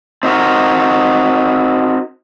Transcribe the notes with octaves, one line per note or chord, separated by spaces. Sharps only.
C4 D#4 F#4 A#4